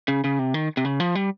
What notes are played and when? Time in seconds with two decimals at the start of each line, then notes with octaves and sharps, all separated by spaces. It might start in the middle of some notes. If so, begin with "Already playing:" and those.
0.08 C#3
0.24 C#3
0.39 C3
0.54 D#3
0.77 C3
0.85 C#3
1.00 F3
1.15 G3